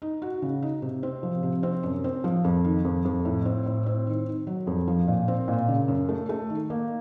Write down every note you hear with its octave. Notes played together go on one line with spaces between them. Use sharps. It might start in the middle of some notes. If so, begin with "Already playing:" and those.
D#4
F#4
C#3
D#4
C3
C4
F3
C3
C4
F#2
C4
F3
F2
D#3
F2
F2
A2
C4
A2
C4
D#3
D#3
F#3
F2
F3
A#2
C4
A#2
C#3
F#2
A3
A3
D#3
A#3